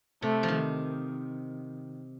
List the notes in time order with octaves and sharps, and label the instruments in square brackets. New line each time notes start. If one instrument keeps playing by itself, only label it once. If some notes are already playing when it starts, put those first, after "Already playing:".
[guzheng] C3 [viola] A3
[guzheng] F3
D#3